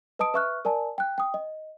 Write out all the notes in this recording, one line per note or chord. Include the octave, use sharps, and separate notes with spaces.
B4 D#5 A5 D#6 D7
B4 E5 C#6 F6 F#6
A#4 D5 G#5 A5
G5 F#6
G5 D#6
D#5